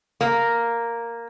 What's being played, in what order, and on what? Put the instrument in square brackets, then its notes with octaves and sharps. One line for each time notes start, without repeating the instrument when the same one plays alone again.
[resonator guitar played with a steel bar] A#3